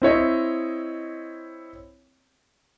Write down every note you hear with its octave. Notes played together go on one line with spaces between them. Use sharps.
C4 E4 C#5 D#5